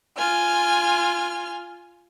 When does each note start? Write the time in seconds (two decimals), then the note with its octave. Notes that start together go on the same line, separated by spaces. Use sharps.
0.18 F4 G#5 F6